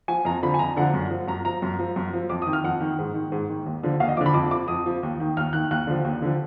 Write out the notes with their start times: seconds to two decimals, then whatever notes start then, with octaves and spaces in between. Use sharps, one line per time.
0.08 F3 G#5
0.25 F2 A#5
0.42 D3 F3 B5
0.54 G#5
0.59 F2 A#5
0.77 D3 F3 F#5
0.94 F#2
1.11 F3
1.28 F#2 A#5
1.45 F3 A#5
1.62 F#2
1.79 F3
1.96 F#2
2.13 F3
2.29 F2 D6
2.42 D#6
2.47 D#3
2.53 F6
2.64 F2 F#5
2.80 D#3
2.99 G#2
3.14 D#3
3.32 G#2
3.50 D#3
3.66 D#2
3.83 D3 F3
4.00 D#2 F5
4.08 D#5
4.17 D3 F3 D6
4.26 B5
4.34 F2 D6
4.51 F3 D6
4.68 F2 D#6
4.86 F3
5.03 D#2
5.20 D#3
5.37 D#2 F6
5.53 D#3 F#6
5.71 D#2 F#6
5.87 D3 F3
6.04 D#2
6.22 D3 F3